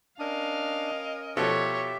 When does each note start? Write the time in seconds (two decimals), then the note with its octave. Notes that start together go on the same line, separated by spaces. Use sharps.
0.19 C#4 D4 A#4 D#5 F5
1.37 B2 F3 G4 A4 C#5 E5